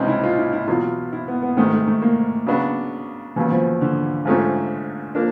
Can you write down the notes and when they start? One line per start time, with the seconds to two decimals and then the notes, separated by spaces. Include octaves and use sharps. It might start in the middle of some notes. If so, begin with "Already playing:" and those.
Already playing: C#2 C3 E3 G3 C4 C#4 D#4
0.08 E4
0.23 F4
0.38 E4
0.53 E4
0.68 E2 B2 F#3 F4
1.13 E4
1.28 B3
1.42 B3
1.57 A1 G#2 D#3 A3
1.73 A3
1.87 A3
2.02 A#3
2.46 C#3 F#3 B3 D4 F#4
3.36 D#2 C#3 E3 F#3 B3
3.51 F3
3.81 D3
4.25 A1 G#2 F3 A3 C#4
5.15 F3 A#3 D4